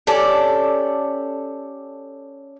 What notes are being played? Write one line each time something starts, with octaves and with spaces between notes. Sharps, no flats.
C#4 G4 A4 D5